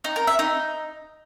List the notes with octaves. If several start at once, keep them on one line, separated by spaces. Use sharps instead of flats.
D#4
A#4
E5
D#4